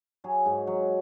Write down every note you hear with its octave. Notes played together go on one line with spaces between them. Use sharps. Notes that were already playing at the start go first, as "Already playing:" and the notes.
F#3 G#4
G#2
F#3